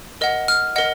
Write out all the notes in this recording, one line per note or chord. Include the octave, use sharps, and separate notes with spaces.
A#4 D#5 F#5
F6
A#4 D#5 F#5